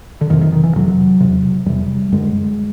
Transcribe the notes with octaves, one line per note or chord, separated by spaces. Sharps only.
D3
F2 C3 D#3
D#3
D#3
E3
F2 C3 F#3
E2 C3
E2 C3 G3
F#2 D3 G#3